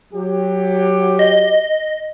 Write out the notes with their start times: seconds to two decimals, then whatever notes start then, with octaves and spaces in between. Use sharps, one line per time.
0.14 F#3 G4
1.19 D#5